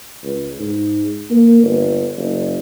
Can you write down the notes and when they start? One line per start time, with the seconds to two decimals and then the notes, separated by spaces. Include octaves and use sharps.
0.23 C#2
0.59 G#2
1.30 A#3
1.63 G1
2.17 F#1